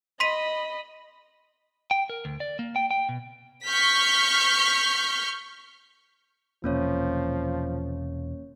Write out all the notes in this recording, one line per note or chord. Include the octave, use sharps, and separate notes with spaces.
D#5 B5 C6 B6 D#7
G5
A#4
D2
D5
A#3
G5
G5
B2
C#6 F6 G6 B6
E1 C3 F3 A#3 C#4 C#5